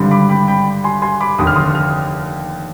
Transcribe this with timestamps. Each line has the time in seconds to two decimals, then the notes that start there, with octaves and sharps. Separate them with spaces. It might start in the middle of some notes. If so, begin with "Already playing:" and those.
Already playing: G#1 G2 D3 G3
0.11 B5 D6
0.30 G5 B5
0.48 G5 B5
0.84 G#5 C6
1.02 G#5 C6
1.21 B5 D6
1.39 F1 D#2 D3 D#6
1.47 F6
1.56 C6 D#6
1.75 F6